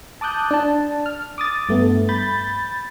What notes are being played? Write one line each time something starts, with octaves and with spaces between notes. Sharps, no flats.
A5 D6 D#6 F#6 G6
D4 A5
F6
D6 D#6 A6
G2 A3 B3
B5 G6 A6